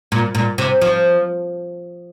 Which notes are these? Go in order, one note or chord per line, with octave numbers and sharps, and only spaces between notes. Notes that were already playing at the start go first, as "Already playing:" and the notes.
A#2
A#2
C3
F3